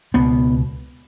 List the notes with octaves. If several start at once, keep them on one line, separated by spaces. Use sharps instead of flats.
C#2 B2 B3